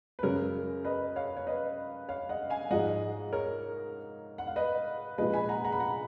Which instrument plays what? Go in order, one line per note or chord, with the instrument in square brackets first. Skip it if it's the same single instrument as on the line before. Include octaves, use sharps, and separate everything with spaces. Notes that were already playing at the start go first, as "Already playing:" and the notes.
[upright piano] B4
F#2 C#3 G#3 A#4 C#5
B4 D#5
C#5 F5
C#5
B4 D#5
C#5 F5
D#5 F#5
F5 G#5
G#2 F3 G#3 D#5 F#5
A#4 C#5
F#5
F5
B4 D#5
A#2 F3 G#3 B4 D#5
G#5 B5
F#5 A#5
F#5 A#5
B5
F#5 A#5